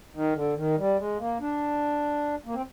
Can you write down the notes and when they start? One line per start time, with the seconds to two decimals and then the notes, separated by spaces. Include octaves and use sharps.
0.15 D#3
0.35 D3
0.57 D#3
0.78 G3
0.99 G#3
1.19 A#3
1.41 D4
2.46 A#3
2.54 C4